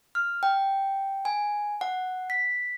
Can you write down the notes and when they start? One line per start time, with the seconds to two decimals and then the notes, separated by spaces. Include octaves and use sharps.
0.15 F6
0.43 G5
1.25 G#5
1.81 F#5
2.30 B6